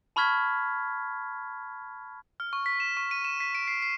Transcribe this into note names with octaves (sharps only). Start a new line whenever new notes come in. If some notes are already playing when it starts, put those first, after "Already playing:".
A5 B5 C#6 F6 G#6 B6
F6
C#6
B6
E7
C#6
D#7
E7
B6
D7
C7
C7